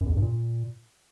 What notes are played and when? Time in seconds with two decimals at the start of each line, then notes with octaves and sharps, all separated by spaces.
0.01 F#2
0.06 E2
0.11 F2
0.17 G2
0.22 A#2